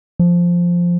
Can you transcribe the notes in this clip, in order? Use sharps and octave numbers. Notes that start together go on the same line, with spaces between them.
F3